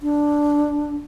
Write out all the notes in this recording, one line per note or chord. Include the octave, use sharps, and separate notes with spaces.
D4